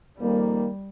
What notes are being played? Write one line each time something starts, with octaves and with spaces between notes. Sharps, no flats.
F2 D#3 G3 A#3